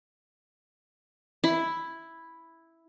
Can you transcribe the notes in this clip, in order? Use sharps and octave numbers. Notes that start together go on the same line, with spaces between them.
E4